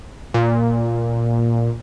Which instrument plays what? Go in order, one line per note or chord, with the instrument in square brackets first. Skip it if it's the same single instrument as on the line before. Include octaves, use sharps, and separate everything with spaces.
[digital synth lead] A#2